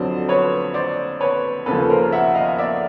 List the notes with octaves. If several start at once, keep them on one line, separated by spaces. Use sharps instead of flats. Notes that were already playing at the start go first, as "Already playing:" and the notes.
Already playing: F2 D3 F#3 C5 D5
B4 C#5
C5 D5
B4 C#5
D#2 C#3 F3 A4 B4
A#4 C5
E5 F#5
D#5 F5
D5 E5